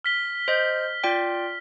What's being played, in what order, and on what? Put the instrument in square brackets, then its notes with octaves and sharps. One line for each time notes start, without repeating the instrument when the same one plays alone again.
[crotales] F6 B6 G7
[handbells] C5 D#5 G6
F4 D5 G5